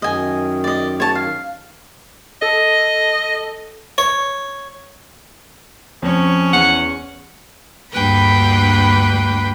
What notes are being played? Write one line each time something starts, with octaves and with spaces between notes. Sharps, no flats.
F#2 D#3 D#5 G#5
D5 D#5
C#5 A5
F5
A4 D#5
C#5
F2 C#4 C#5
E2 F#5
D2 G2 A#3 B4 G5 B5